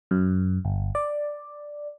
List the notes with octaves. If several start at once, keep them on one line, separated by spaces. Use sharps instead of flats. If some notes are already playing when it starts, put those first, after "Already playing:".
F#2
G1
D5